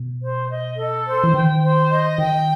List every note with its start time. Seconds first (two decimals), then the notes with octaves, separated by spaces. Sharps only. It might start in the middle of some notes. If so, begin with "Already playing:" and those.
Already playing: B2
0.21 C5
0.49 D#5
0.78 A4
1.06 C5
1.24 E3
1.34 D#3 G5
1.62 C5
1.90 D#5
2.18 D#3 G5